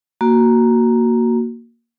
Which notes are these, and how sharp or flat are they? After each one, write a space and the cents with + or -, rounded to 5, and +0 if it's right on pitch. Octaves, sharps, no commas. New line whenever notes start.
A#3 +0 F#4 +0